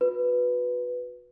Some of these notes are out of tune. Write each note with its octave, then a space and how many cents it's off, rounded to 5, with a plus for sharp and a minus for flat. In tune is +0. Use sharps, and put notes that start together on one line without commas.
F#4 -30 B4 +0